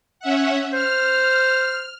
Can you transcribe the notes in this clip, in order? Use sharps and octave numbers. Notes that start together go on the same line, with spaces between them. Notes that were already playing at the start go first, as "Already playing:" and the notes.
C#4 E5 F#5
C5 F6